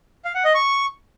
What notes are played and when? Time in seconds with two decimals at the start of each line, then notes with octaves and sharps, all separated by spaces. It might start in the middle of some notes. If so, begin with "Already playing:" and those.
0.25 F5
0.35 F#5
0.45 D#5
0.55 C#6